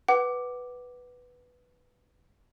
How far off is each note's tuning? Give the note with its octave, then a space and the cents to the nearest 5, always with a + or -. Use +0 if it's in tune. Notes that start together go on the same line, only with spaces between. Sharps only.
B4 +0 F#5 +15 D6 +0